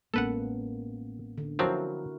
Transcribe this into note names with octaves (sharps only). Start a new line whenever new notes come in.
A1 G#3 A#3 B3 C#4 A4 B4 F#5
D3
F3 F#3 C4 E4 F#4 A#4